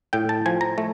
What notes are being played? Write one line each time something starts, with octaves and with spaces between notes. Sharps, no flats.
A2 G5
A5
F3 G#5
A#5
A3